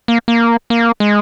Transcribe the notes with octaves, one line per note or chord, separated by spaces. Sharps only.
A#3
A#3
A#3
G#3